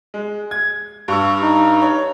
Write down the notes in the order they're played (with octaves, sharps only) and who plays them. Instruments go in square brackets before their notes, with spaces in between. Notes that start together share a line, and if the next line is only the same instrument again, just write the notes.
[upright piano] G#3
G#6
G2 C#6 E6
[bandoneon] D#4
[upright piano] C#5